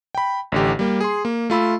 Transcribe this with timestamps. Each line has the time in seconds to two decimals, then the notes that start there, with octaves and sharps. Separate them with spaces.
0.15 G5 B5
0.52 A1 D3 G4
0.79 G3 A#3
1.00 G#4 C6
1.25 A#3
1.50 A3 F4 B5 E6